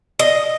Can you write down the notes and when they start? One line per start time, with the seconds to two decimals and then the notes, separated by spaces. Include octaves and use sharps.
0.19 D#5